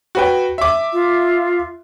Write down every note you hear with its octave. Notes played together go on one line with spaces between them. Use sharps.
F#4 B4 G5
E5 D6
F4